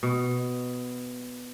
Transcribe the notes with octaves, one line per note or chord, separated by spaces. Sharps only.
B2